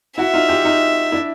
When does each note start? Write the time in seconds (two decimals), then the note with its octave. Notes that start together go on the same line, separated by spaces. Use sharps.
0.18 E4 F#4 E5
0.34 D#4 F4
0.49 F4 G4
0.65 D#4 F4
1.12 D4 E4